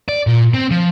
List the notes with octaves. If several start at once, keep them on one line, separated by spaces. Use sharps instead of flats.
D5
A#2
C4
F3